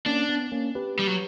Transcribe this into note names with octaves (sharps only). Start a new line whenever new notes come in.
A#3 C#4 D4
B3
A#3 C#4
G4 B4
G3
F#3